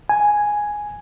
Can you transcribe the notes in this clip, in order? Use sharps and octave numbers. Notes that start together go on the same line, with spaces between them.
G#5